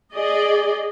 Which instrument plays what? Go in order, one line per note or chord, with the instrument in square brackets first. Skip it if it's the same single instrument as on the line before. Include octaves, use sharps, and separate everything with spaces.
[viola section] G#4 D5 D#5